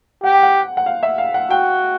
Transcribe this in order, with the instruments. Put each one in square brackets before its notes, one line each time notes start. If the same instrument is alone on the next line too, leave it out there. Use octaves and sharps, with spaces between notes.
[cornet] G4 [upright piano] F#5
[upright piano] G5
F#5
F#5
F5
E5
F5
F#5
[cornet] F#4 [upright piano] G5